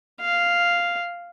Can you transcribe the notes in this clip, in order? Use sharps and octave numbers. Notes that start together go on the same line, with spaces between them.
F5